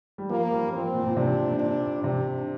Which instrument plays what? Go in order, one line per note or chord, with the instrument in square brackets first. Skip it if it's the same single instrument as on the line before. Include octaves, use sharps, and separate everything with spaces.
[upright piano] G3
[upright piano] F3 [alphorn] A#3
[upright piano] G3
[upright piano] F3 [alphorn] C4
[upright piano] A#2
A#2
[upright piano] C3 [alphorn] D4
[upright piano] A#2
[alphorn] D4
[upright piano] C3 [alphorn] D4